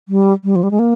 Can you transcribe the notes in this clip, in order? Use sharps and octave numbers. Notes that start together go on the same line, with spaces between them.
G3
G3
F3
G3
G#3
A#3